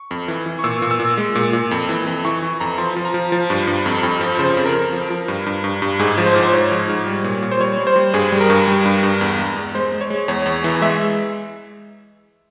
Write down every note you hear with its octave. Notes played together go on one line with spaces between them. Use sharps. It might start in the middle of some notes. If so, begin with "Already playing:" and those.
Already playing: C#6
F2
E3
E3
C#6
A#2 E6
A#2
E6
A#2
G#3
A#2
A#2
F2
E3
F2
E3 C#6
E3
F2 A#5
F3 C6
F3
A#5
F3
F3
G2
G2
F2
F2
F3
C#3 C5
F2
A#4
F2
F3
F3
G2
G2
G2
G2
G#2 G#4
F3
C5
G#2
C5
G#2 C#5
F3
G#2
G3
A#2
A#2
C5
G3 C#5
G3
C5
G3
G2 G#4
G3
A#4
G2
G3
G2
G2
E2
G#3
E2
G#3 C5
G#3
C#5
G#3
E2 C#5
E2
E3
G#3 E5